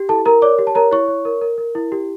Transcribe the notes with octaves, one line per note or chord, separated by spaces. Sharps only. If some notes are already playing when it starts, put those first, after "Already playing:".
Already playing: G4
E4 A4 A5
A#4 A#5
C#5 D5 D6
G4
A5
A#4 C#5 A#5
E4 C#5 C#6
C#5
A#4
A#4
A#4
E4
G4